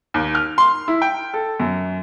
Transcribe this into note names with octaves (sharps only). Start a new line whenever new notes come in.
D#2
F6
C6
E4
G5
A4
F#2